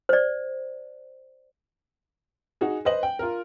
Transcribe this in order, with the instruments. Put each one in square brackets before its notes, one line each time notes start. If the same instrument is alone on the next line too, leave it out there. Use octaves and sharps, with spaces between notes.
[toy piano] C5 D5
[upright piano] D#4 F#4 G#4
B4 C5 D#5 F#7
G5
F4 A#4